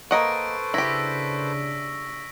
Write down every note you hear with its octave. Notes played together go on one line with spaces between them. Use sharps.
A#3 A4 B4 C5 D#5 F#5 C#6 D7
C#3 D4 E4 G4 E6 A#6 B6